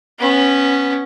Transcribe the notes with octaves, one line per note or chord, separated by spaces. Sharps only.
B3 C#4